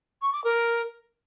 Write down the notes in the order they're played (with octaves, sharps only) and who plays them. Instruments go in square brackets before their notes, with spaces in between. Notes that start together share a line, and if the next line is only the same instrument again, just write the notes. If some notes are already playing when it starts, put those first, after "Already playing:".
[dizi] C#6
D6
A#4